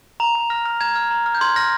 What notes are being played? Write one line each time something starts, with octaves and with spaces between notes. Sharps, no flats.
A#5 F7
A#5
F6 A#6
F6
A#5 G#6
F6
A#5
F6
G6
C6 G#6
F6 A#6